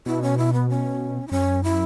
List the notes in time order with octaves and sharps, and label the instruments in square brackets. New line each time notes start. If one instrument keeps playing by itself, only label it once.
[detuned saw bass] B2 [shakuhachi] E4
[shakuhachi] C#4
E4
B3
C#4
E4
[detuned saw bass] F#2 [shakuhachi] C#4
[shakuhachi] E4